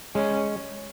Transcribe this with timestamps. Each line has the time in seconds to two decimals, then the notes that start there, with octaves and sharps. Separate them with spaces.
0.15 G#3 C#4